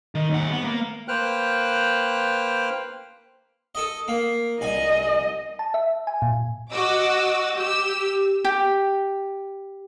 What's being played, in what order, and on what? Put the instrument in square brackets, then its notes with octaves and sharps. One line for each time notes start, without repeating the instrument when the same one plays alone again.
[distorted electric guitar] D#3
D#2 F#5
B3
A#3
[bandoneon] A#3 B4 C5 G5 F6 F#6
[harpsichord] A4 D#5
A#3
[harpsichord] C2 G#5 [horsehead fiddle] D#5
[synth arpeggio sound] A5
E5
G#5
A#2
[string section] F#4 D#5 D6 E6
G4 E6
[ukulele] G4